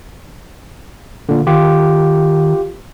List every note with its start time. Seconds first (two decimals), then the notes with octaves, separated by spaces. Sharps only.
1.29 A#2 D3
1.47 D#3 F4 G4